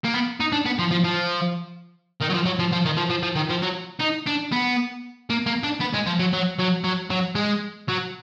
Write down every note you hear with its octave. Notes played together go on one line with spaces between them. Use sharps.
A#3
B3
D#4
D4
B3
F3
F3
F3
D#3
F#3
F3
F#3
F3
F3
D#3
F3
F3
F3
D#3
F3
F#3
D#4
D4
B3
A#3
A#3
D4
B3
G#3
F3
F#3
F#3
F#3
F#3
F#3
G#3
F#3